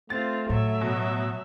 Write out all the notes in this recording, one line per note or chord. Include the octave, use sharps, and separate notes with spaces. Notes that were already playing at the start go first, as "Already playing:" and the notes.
A3 C4 F4 A6
A2 F#3 E5
B2